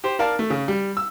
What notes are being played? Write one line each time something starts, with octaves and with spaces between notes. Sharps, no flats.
G4 C5
A#4 D5 F5 A5
A3
C#3
G3
E6